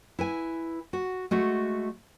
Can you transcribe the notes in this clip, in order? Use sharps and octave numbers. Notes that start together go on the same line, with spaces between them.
E4 B4 G#5
F#4
G#3 A3 F#4